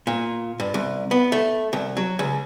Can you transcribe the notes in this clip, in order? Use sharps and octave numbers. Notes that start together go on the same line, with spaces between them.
A#2
G2
C2
B3
A3
C2
F#3
C#2